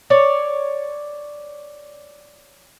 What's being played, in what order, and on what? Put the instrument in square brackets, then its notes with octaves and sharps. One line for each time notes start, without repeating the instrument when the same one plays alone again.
[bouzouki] C#5 D5